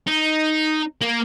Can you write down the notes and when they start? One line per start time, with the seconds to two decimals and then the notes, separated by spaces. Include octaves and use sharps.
0.07 D#4
1.01 A#3